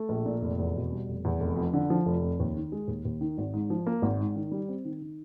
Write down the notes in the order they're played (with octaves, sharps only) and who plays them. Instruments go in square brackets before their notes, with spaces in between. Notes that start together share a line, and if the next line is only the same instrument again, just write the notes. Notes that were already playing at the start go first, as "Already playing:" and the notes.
Already playing: [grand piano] A3
A#1
A#2
F1
E2
B2
G3
F1
E2
F1
F2
D3
F3
F1
F2
D#2
D#3
G#3
D#2
D#2
D#3
G#1
G#2
F3
A#3
G#1
G#2
D#3
G3
C4
D#3
D#3